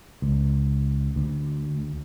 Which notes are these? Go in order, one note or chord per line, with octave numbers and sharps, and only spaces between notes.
C#2
D2